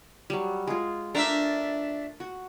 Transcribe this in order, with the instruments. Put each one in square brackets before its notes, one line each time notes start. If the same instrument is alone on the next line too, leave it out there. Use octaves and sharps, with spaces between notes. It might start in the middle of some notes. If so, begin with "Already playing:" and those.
[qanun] F#3 G3
G#3 F4
[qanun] A3 A#4 A#5 [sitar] D4 E5
[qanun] F#4